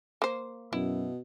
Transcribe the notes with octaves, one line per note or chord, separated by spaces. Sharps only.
A#3 C5
F#2 B2 E4